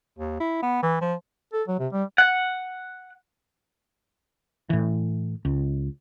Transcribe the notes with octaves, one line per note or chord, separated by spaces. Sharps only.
D#2
E4
B3
E3
F3
A4
F#3
C3
G3
F#5
A2 E3
C#2